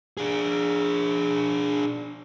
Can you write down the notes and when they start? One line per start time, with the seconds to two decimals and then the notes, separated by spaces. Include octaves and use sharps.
0.17 D4 G#4